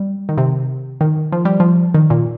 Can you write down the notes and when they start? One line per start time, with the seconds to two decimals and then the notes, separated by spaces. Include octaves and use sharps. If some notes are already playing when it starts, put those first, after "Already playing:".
Already playing: G3
0.29 D#3
0.38 C3
1.01 D#3
1.32 F3
1.45 G3
1.60 F3
1.95 D#3
2.10 A#2